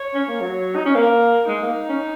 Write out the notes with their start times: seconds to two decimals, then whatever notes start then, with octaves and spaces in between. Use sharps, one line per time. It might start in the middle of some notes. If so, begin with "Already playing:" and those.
Already playing: C#5
0.14 C#4
0.28 A#3
0.41 F#3
0.75 D#4
0.85 C#4
0.95 A#3 A#4
1.48 G#3 D#4
1.62 A#3
1.89 C#4